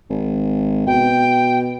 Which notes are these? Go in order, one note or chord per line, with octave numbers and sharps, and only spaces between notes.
G#1
B2 G5